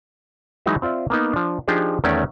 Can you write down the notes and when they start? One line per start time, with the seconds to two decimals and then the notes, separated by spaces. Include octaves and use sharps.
0.66 E3 F#3 G#3 D#4 F#4 E5
0.82 C4 F4 D5 E5
1.10 A#3 B3 D#4
1.33 F3 D4
1.68 F3 D4 D#4 G4 G#4
2.04 E2 D#3 A3 C#4 C#5 D5